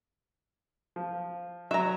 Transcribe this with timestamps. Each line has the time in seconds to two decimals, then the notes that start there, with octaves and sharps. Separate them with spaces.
0.96 F3
1.71 F#3 E5 A#5